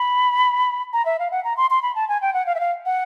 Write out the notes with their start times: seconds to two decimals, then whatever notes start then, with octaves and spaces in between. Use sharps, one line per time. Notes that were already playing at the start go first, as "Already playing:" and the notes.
Already playing: B5
0.93 A#5
1.06 E5
1.19 F5
1.31 F#5
1.44 A#5
1.57 C6
1.70 C6
1.82 B5
1.95 A5
2.09 G#5
2.22 G5
2.34 F#5
2.46 F5
2.55 E5
2.60 F5
2.85 F#5